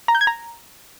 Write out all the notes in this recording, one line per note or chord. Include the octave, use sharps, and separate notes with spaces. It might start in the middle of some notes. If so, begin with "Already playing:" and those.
A#5
G6
G#6
A#5